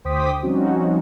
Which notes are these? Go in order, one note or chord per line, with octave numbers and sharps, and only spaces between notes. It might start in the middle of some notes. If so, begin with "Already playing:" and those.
D2 C5 G5 D6 D#6 B6
F3 G3 C4 C#4 D#4 F#4